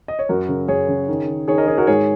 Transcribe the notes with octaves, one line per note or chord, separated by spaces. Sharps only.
D#5
C#5
F#2 F#4 A#4
C#3
F#2 G#4 C#5
C#3
D#3
D#3
D#3 G#4 C#5
A#4 D#5
D#3 G#4 C#5
F#4 A#4
G#2 G#4 C#5